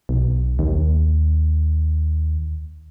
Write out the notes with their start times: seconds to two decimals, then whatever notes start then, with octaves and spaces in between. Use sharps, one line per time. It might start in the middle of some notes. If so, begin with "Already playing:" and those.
0.09 B1
0.59 D#2